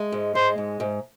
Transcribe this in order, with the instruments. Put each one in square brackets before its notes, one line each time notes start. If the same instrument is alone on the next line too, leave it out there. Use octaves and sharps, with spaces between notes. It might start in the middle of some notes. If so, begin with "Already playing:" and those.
Already playing: [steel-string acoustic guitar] G#3
G#2
[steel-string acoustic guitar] G#3 [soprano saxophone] C5
[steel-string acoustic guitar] G#2
G#2